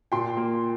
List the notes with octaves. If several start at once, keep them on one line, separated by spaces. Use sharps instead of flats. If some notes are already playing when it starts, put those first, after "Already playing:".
A#2 G5 C6
A#3